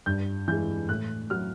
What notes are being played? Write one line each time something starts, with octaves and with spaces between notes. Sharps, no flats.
G2 G6
E3 G#3 G6
A2 F#6
F#3 F6